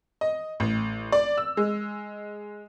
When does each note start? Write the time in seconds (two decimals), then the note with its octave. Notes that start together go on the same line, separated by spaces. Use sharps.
0.21 D#5
0.60 A1
1.12 D5
1.38 E6
1.57 G#3